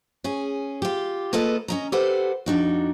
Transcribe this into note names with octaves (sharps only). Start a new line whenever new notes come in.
C#4 G#4
F4 G4
A#3 F4 A4 B4 D#5
C#4 D#5 A#5
G4 A4 B4 C5 F#5 G5
F2 D4 D#4 F#4